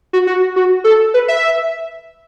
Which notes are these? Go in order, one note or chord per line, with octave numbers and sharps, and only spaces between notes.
F#4
F#4
F#4
A4
B4
E5